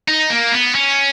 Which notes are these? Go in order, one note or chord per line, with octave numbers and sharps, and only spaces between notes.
D#4
A#3
B3
C#4